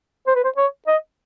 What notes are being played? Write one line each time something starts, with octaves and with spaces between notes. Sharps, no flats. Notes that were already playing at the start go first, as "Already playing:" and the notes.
C5
B4
C5
C#5
D#5